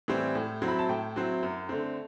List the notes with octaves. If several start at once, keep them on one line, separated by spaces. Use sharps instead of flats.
A2 E3 G3 C4
A2
F#3 C4 E4
B5
A5
A2 G5
F#3 C4 E4
F#2
D3 A3 C4